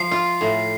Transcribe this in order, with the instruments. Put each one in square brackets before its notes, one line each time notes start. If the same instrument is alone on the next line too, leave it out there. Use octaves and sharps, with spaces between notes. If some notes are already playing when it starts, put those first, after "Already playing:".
Already playing: [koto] F3 [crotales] C7
[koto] F4
A2